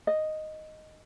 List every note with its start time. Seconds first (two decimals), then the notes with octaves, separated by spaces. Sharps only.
0.07 D#5